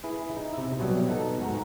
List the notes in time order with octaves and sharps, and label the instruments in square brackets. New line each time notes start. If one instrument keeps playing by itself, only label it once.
[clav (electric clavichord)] E4 G#4 B4
D#4
C3 E5
B2 F#3 G3
B3 D#4 A4
G#2 F#4 F#5 A#5